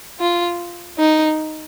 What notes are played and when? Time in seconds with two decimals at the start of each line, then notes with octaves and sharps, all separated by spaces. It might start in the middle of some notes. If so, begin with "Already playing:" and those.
0.20 F4
0.99 D#4